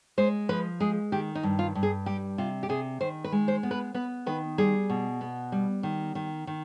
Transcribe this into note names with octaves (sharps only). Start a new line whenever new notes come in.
G#3 C5
F3 B4
G#3 G#4
D#3 G4
D#4
G2
F4
G2
G#4
G3 G4
C3 F4
G4
C3 G#4
D#3 C5
B4
G#3
C5
B3
B4
B3 B4
D#3 B4
G3 G#4
B2
B3
G3
D#3
D#3
D#3